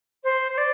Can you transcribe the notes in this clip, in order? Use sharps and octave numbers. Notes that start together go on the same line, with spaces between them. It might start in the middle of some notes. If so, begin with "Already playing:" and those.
C5
C5
D5